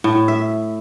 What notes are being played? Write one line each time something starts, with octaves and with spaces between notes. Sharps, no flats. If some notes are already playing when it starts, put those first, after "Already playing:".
A2
E5